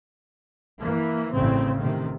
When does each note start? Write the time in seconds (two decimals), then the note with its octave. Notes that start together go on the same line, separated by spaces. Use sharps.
0.80 E3 A#3
1.33 A1 C#3 C4
1.80 A1 C3 D#3